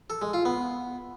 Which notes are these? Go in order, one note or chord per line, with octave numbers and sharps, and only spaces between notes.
A4
G#3
F4
B3